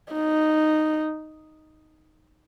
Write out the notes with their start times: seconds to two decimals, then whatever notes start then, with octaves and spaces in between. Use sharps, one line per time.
0.13 D#4